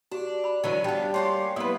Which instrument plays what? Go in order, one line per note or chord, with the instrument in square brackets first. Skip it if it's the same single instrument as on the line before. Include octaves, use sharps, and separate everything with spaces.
[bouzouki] D4 [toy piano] F#4 G4
[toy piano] B5
[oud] D3 E3 F#3 [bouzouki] C#4 [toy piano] D#5 A5
[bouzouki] F3 B3 [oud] G3 [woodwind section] D4 [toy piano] G5
[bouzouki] A#3 C#4 G4 [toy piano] C#5 F#5 C#6 [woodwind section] C6
[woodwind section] F#3 A#3 B3 [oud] E4 B4 [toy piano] D#6